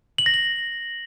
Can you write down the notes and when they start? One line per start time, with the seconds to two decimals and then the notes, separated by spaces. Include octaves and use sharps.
0.18 F#7
0.26 A#6
0.34 F#7